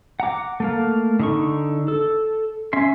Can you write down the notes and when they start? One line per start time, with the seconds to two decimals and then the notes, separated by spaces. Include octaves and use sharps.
0.20 F#5 A#5 D6
0.60 A3 A#3 F5
1.20 D3 D#4 C#6
1.88 A4
2.73 C#4 E5 C6